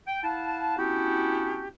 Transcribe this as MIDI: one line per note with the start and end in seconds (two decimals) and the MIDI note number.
0.07 0.20 79
0.22 0.75 64
0.22 0.75 77
0.22 0.75 78
0.22 0.75 81
0.78 1.69 59
0.78 1.69 61
0.78 1.69 62
0.78 1.69 64
0.78 1.69 66
0.78 1.69 67